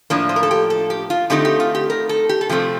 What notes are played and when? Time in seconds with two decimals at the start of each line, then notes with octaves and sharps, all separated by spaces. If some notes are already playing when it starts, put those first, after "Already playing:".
0.10 A2 F3 A#3 D4 A#4
0.29 C5
0.36 A#4
0.43 A4
0.51 G4
0.70 A4
0.90 G4
1.10 F4
1.30 D3 A3 C4 D#4 G4
1.45 G4
1.60 F4
1.75 G4
1.90 A#4
2.09 A4
2.29 G4
2.41 A4
2.49 C3 F3 A3 C4 G4